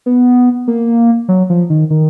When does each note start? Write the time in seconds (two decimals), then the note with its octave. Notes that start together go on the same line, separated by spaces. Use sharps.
0.06 B3
0.67 A#3
1.28 F#3
1.50 F3
1.70 D#3
1.90 D#3